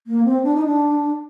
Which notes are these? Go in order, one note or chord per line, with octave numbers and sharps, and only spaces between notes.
A#3
C4
D4
D#4
D4